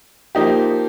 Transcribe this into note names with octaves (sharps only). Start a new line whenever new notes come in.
F3 A#3 D#4 G4